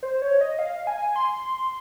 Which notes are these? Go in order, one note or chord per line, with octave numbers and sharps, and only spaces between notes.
C5
C#5
D#5
F5
G#5
C6